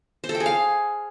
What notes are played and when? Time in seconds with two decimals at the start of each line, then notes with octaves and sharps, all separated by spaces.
0.24 C5
0.29 A4
0.35 G5
0.40 G#4
0.46 F5